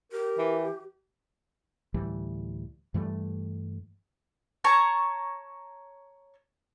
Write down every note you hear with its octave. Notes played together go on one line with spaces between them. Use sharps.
G4 A#4
E3
D2 A2 E3 G3
G2 E3 G3 A3
C#5 A5 A#5 C#6